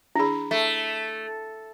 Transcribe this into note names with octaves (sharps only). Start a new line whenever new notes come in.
D4 E4 G#4 B5
A3